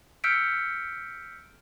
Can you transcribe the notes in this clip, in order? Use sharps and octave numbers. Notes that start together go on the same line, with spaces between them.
E6 F6 G6 B6 C#7 D7